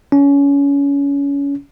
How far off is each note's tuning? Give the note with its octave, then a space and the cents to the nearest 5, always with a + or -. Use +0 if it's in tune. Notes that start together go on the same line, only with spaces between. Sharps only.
C#4 +25